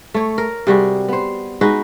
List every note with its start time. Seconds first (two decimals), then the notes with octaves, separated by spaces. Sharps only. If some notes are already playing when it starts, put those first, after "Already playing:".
0.14 A3 C#5
0.38 A#4
0.67 C3 G3 F#4 G#4
1.08 B3 C5
1.61 G#3 D#4 F#4 B4